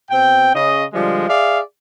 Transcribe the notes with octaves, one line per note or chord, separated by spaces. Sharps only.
B2 C4 G5
C#3 D#5
D3 F3 G3 G#3
G#4 D5 E5 F5